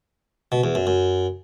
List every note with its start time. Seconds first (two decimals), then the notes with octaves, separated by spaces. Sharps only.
0.52 B2
0.64 E2
0.75 F#2
0.87 F#2